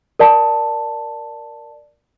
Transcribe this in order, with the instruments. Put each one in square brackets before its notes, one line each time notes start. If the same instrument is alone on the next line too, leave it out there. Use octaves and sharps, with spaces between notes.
[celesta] A#4 D5 A5